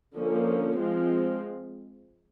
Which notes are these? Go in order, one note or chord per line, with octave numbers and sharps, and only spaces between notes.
D3 F3 A#3 C#4
F3 G#3 C4 F4